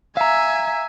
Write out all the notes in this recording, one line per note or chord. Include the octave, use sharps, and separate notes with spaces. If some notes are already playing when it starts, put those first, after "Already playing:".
E5 F5 G#5 A#5